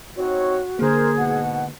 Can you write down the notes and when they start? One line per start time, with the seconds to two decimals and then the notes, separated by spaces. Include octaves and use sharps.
0.17 C4 D#4 F#4 C#5
0.79 D3 A#3 G#4 A#4 C5
1.18 G#2 B2 F#5